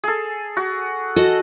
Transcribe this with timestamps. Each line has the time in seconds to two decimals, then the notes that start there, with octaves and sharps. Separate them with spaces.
0.04 G#4 A4
0.57 F#4
1.16 F#4 A4 D#5